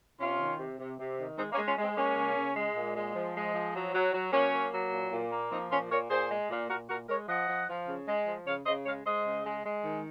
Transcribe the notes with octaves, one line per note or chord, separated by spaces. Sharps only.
C3 C#4 F4
D#3
C3
C3
C3
D#3
G#3 C4 D#4
A#3 C#4
G#3
C#4 F4
G#3
C4
G#3 A#3 C#4
C#3
C#3
G#3
A#2
G#3
F3
G#3
F3
F#3
F#3
F#3
F#3 A#3 C#4
A#3
F#3
A#2
A#2
A#3
F3 C4 D#4
A#2 C#4 F4
A#2 A#4 C#5
A#2 G#4 C5
G#3
A#2
A#2 F#4 A#4
A#2 F#4 A#4
G#3 A#4 C#5
F3 D#5 F#5
F3
F3
C#3
G#3
F3
C#3 C#5 F5
C#3 C5 D#5
G#3 C#5 F5
G#3 C5 D#5
C#3
G#3
G#3
D#3